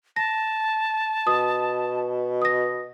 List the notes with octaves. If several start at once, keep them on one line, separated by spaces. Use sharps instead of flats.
A5 A#6
B2 D#6
D#6 A#6